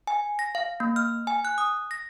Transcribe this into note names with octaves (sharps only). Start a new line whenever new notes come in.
G#5
A#6
F5
A#3
F6
G#5
F#6
D#6
A#6